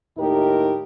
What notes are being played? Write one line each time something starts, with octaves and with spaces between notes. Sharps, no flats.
D#2 A2 D#4 G4 A#4